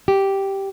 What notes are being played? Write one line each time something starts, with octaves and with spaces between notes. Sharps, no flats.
G4